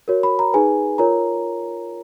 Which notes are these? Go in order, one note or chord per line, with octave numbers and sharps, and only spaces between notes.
F#4 A#4 C#5
B5
A#5
D#4 G#4 B4 G#5
F4 A#4 C#5 A#5